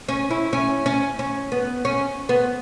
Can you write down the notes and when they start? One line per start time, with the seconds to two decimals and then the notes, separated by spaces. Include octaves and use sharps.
0.09 C#4
0.30 E4
0.53 C#4
0.86 C#4
1.19 C#4
1.52 B3
1.85 C#4
2.29 B3